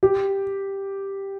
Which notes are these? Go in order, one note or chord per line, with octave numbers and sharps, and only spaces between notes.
G4